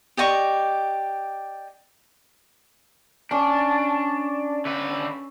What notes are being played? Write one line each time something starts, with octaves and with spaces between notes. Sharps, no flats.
G4 D5 D#5 C#6
C#4 D4
D3 B4